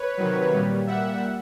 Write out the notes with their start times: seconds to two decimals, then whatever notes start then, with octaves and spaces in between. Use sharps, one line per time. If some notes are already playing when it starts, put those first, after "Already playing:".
Already playing: B4 C#5
0.18 C3 D#3 F#3
0.52 A#2 G3
0.87 A#2 G3 E5 F#5